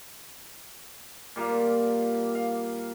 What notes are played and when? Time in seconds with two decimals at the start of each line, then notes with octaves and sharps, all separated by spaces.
1.36 A#2 G3 A#3 F5
2.35 F5